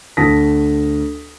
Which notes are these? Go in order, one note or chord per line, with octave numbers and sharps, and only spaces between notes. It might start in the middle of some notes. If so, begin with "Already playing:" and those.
D2 A5 D#6 A#6 B6